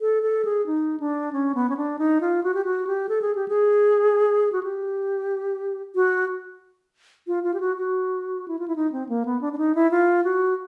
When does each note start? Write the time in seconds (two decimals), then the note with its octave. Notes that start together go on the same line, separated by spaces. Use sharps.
0.01 A4
0.23 A4
0.45 G#4
0.67 D#4
1.00 D4
1.33 C#4
1.55 B3
1.69 C#4
1.77 D4
1.99 D#4
2.21 F4
2.43 F#4
2.54 G4
2.65 F#4
2.87 G4
3.09 A4
3.22 G#4
3.35 G4
3.48 G#4
4.52 F#4
4.63 G4
5.95 F#4
7.27 F4
7.43 F4
7.54 G4
7.60 F#4
7.77 F#4
8.48 E4
8.59 F4
8.68 E4
8.76 D#4
8.92 C4
9.09 A#3
9.25 B3
9.41 D4
9.53 D4
9.58 D#4
9.75 E4
9.91 F4
10.24 F#4